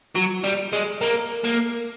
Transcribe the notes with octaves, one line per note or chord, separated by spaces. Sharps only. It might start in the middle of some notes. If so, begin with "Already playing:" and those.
F#3
G3
G#3
A#3
A#3